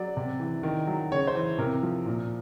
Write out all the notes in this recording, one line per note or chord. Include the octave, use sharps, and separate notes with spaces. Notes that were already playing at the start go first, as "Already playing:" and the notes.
Already playing: F#3 D5
C3
E3
D#3
F#3
C#3 C#5
C5
E3
C3 A#4
F3
A#2